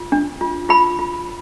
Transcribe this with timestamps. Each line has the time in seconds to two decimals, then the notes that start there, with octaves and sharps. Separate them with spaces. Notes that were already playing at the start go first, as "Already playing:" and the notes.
Already playing: F4
0.12 D4
0.41 F4
0.69 F4 B5
0.99 F4